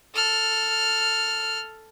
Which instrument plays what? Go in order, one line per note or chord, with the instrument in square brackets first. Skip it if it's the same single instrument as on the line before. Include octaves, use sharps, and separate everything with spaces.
[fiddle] A4 F6